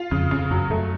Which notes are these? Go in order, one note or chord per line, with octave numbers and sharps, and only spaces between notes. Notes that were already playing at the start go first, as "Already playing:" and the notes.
Already playing: F4
F2 C#3
F2 C#3
F#2 F#3
F#2 A3